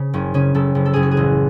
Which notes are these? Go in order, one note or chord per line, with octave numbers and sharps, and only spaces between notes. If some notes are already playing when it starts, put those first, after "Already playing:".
Already playing: C#3
F#1 C#4
C#3 C#4
F#1 A4
F#1
A4
F#1 G#4
F#4
G#4
A1